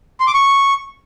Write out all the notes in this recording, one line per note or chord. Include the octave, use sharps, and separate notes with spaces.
C6
D6
C#6